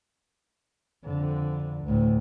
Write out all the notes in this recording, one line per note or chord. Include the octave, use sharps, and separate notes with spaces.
F2 D3
D2 A2